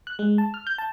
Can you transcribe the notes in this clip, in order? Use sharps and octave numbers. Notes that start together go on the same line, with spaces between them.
F#6
G#3
A5
F6
G6
A5